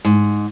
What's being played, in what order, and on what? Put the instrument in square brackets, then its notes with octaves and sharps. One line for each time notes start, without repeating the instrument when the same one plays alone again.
[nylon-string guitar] G#2